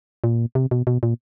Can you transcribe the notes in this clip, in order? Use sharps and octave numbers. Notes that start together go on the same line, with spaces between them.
A#2
C3
B2
B2
A#2